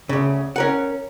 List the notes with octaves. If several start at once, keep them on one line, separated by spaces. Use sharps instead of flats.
D2 C#3
C#4 A#4 F#5